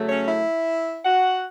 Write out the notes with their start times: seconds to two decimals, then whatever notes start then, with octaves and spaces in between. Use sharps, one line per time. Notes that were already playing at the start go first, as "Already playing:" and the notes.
Already playing: C#3 F#3 A3
0.09 C#4 C#5
0.28 E4 E5
1.05 F#4 F#5